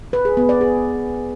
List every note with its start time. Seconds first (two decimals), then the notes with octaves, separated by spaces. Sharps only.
0.13 B4
0.25 G#4
0.37 B3
0.49 D5
0.61 G#4